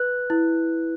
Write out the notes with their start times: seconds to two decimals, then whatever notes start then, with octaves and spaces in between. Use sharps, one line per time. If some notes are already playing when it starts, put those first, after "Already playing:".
Already playing: B4 F#6
0.30 E4